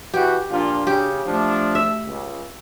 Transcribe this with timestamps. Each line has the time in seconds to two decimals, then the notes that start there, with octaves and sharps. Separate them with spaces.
0.14 E3 F#4 G4
0.50 A#2 F3 D4 F4
0.87 C#3 G4
1.26 F3 A3 D4
1.75 E5
2.06 C#2